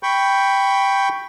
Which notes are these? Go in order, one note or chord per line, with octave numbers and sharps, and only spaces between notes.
G5 B5 C#6 G6